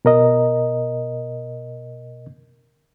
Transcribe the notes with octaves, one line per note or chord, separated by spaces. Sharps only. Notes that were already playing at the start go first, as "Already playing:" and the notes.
B2 A#4 D#5